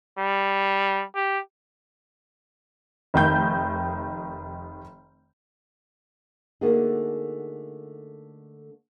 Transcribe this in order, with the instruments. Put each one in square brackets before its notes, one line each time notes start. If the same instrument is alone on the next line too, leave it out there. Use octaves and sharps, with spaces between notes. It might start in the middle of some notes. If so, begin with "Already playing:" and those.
[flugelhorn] G3
G4
[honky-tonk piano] F1 D#3 G6
[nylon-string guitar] D3 A3 A#3 D#4 F#4 G#4